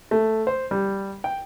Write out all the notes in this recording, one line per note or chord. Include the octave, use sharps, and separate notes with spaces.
A3
C5
G3
G5